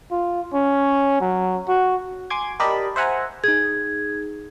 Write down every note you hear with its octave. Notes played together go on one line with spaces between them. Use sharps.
F4
C#4
F#3
F#4
G#5 C6 D6 G#6
G4 A#4 D5 D#5 A5 B5
C5 E5 F#5 G#5 A#5
D#4 G#4 G#6